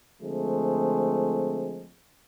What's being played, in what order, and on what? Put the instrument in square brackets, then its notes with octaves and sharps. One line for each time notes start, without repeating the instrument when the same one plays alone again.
[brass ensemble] D3 F3 G#3 A3 C4